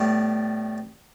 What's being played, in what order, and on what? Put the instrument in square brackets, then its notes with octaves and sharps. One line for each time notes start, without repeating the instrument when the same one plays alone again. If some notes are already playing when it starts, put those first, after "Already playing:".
Already playing: [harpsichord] A2 G3 B3